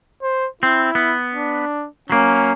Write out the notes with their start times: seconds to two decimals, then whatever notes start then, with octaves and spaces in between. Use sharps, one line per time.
0.23 C5
0.63 C4 E4
0.95 B3
1.34 D4
2.10 F#3 A#3 C#4